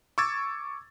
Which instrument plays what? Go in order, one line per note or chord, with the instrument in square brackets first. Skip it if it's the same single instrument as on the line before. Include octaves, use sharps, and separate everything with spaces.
[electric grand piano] C#6 D6 E6 G#6 A6